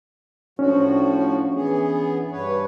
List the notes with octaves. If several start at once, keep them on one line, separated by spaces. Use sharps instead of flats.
A2 F3 C#4 D4 F#4
E3 B3 G#4
G2 B4 C#5